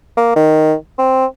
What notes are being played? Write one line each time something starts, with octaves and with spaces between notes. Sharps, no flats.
A#3
D#3
C4